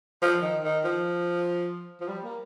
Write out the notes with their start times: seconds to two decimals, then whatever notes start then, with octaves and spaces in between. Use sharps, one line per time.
0.22 F3
0.42 D#3
0.64 D#3
0.85 F3
2.01 F3
2.08 G3
2.24 A#3